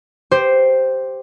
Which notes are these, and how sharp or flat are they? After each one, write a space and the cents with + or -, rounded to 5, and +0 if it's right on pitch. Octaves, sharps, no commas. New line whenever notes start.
G4 +0 C5 +0